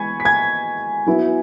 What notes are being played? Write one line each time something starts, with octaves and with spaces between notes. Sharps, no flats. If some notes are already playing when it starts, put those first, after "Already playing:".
Already playing: E3 G#3 B3 G#5 B5 C#6 G#6
B6
G#5 G#6
F#3 B3 E4